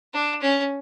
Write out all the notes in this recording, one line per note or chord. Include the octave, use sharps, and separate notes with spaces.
D4
C#4